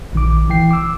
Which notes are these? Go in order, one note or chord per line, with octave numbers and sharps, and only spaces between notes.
A#1 D#3 D6
E3 G5 C7
D6 E6